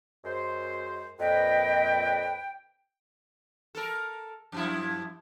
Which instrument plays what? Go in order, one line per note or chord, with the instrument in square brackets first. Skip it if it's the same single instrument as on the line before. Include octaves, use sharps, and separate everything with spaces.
[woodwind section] F#2 G#3 C5
[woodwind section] F2 A#2 B4 [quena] D#5 [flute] G5
[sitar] A4 A#4
F#2 F3 E4